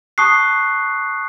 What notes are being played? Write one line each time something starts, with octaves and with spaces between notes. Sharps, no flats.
A5 C#6 D#6 F#6 C7